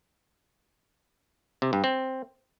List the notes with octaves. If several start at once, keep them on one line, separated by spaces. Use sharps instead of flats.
C3
G2
C4